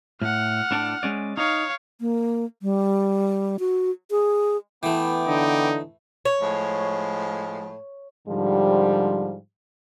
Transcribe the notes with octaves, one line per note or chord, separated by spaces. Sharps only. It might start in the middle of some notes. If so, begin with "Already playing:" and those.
A2 F#5 F6
A2 D4 D5
G#3 C#4 D5
D#4 C#5 F5
A#3
G3
F#4
G#4
E3 A3 B3 G5 D6
D3 D#4
C#5
A2 F3 G#3
G#2 D3 F3 G3